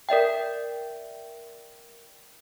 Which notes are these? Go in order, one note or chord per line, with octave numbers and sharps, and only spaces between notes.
A#4 D5 E5 G5